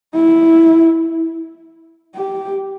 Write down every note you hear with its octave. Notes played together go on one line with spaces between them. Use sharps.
E4
G4